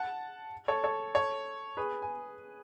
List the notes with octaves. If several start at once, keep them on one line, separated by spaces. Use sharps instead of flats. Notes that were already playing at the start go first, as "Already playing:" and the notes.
Already playing: F#5 A5
A4 C#5
A4 C#5
A4 C#5
G#4 B4
G#5